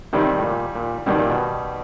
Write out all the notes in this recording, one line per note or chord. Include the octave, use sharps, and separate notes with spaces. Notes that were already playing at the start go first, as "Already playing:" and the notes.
G2 C3 D#3 G3
A2
A#2
A#2
G2 B2 D#3 G3
A#2
B2